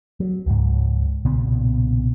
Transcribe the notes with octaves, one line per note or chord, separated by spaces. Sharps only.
F#3
C#2 G#2
B1 A#2 C#3 B3